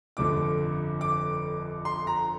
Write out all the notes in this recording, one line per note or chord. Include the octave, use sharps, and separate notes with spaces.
G1 F2 D3 F3 A3 D6
D6
C6
A#5